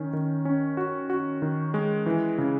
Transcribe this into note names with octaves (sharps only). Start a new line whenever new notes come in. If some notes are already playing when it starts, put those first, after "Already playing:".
Already playing: D#3 C#4
D#3
C#4
F#4
F#4
D#3
G#3
E3
C#3